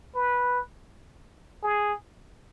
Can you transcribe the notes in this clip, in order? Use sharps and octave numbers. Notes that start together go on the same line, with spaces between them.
B4
G#4